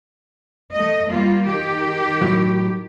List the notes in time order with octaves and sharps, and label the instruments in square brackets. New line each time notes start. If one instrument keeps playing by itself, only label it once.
[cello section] A3 D#5
G3 A#3 F4
D#3 G4
[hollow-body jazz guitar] A2 F#3